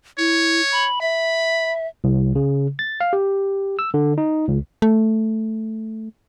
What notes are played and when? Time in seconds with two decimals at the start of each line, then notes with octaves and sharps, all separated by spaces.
0.18 E4 C#5
0.71 B5
1.01 E5 B5
2.04 C2
2.35 C#3
2.79 A6
3.01 F5
3.13 G4
3.79 E6
3.94 D3
4.18 D#4
4.48 C#2
4.82 A3